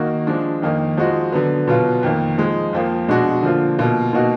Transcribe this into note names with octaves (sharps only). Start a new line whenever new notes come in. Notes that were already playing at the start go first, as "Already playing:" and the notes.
Already playing: D#3 A#3 D#4 F#4
F3 G#3 D4
F2 D#3 A#3 D#4
F3 G#3 D#4 F#4
D3 F#3 B3
B2 F#3 B3 F4
F2 D#3 A#3
F3 G#3 D#4
F2 F3 A#3
B2 G#3 D4 F#4
D3 F3 A#3 F4
B2 A#3 F4
B2 A#3 D#4 F#4